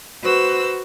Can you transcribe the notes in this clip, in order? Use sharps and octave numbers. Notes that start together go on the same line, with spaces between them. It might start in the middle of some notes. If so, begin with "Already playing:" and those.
F#4 B4 C5 E6